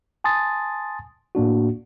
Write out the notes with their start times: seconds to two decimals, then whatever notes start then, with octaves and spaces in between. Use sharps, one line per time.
0.24 G#5 A5 C6 D#6 A6
1.35 A2 A#3 D4 F#4